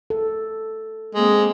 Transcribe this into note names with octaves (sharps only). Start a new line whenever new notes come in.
A4
G#3 A#3 C4